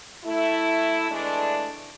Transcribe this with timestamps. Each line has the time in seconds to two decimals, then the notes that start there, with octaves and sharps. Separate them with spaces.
0.24 A3 E4
1.10 E3 G#3 A3 D4